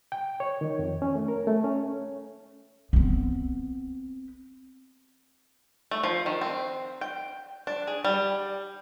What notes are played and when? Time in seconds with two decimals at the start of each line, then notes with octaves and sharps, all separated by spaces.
0.12 G5
0.40 C#5
0.61 D#3
0.79 F2
1.02 C#4
1.15 A3
1.28 A#4
1.47 A3
1.64 C#4
2.93 B3 C4
5.91 A3
6.03 F3
6.26 D#3
6.41 C4
7.01 G5
7.67 D4
7.87 G#4
8.04 G3